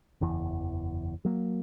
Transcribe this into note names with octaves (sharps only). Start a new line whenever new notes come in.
F#1 E2 E3
F#3 A#3